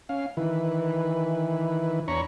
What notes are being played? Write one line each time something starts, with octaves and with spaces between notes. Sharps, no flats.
C#4 F5
D#3 E3 E4 B4
E2 D4 C#5 A#5 B5 C#6